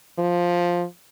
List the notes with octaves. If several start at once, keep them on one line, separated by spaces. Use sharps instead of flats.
F3